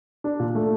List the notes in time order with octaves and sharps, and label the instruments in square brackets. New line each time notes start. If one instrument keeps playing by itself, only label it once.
[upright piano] D4
A#2
A3